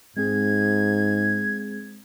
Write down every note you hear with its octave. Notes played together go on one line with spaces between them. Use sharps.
G#2 G#3 C4 G#4 G#6